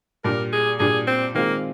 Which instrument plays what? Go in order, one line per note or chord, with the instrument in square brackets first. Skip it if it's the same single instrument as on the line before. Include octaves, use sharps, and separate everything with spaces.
[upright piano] A#2 G3 D4 [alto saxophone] A#4
[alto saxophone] G#4
[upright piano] A#2 G3 D4 [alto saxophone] G#4
[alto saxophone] C4
[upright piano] D#3 G#3 C4 F4 [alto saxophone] A#3